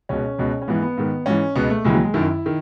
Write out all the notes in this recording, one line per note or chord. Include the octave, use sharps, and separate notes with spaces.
C#2 B2 C#4
C#2 B2
C#4
G#2 E3 B3
B3
G#2 D#3
G#2 E3 C#4
C#2 B2 B3
A3
D#2 C#3 E3 G#3
F#3
G#3
F#2 D#3 E4
D#3